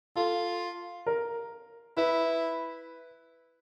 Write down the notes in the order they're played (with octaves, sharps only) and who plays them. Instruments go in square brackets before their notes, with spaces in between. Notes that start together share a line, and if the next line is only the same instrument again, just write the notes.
[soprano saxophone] F4 [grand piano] A4
[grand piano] A#4
[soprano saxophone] E4 [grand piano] B4